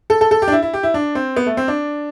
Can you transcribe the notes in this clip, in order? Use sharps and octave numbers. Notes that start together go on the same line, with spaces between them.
A4
A4
A4
G4
D4
E4
E4
G4
E4
D4
C4
B3
A3
C4
D4